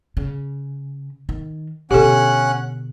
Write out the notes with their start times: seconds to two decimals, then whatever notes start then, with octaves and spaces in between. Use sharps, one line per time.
0.17 C#3
1.29 D#3
1.91 B2 D3 C#4 G4 A4 F#5 F#6